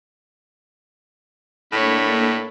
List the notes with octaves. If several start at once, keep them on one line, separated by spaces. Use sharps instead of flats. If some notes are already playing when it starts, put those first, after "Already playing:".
A2 A#3 D4 A4 C#5 B5